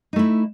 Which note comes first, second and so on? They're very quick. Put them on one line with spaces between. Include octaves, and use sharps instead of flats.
D#4 A3 E4